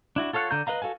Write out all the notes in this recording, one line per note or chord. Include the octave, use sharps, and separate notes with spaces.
D4 E4 F#4
F4 A4 C#5 F5 F#5
D3 D5 A#5 G6
B4 D#5 F5 A#5
F#4 A4 F5 G#5